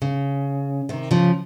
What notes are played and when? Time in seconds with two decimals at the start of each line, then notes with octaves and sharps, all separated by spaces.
0.02 C#3
0.89 C3 D#3
1.11 C#3 F3